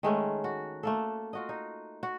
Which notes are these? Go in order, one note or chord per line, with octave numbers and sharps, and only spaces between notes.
D#3 G#3 A3 C#4
F#4
A3 A#3 A4
F4 F#4 D#5
D#4
F#4